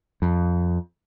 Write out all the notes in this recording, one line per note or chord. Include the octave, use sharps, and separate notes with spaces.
F2